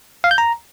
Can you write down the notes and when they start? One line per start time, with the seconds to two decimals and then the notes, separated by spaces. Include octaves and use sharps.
0.24 F5
0.31 G6
0.38 A#5